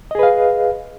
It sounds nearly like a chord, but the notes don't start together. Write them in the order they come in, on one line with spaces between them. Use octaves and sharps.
D#5 G#4 B4 F5